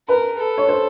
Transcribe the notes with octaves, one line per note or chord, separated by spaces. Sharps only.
A#4 B4
A4
C#5
C5